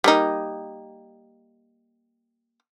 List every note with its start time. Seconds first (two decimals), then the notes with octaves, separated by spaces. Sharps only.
0.04 G3 A#3 D#4